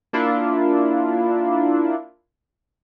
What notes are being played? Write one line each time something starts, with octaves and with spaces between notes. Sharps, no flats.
A#3 D4 E4 F4